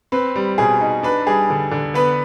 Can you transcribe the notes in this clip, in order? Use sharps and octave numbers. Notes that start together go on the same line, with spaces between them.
C4 B4
G3
B2 G#4
D#4
D4 B4
G3 G#4
D3
D3
B3 B4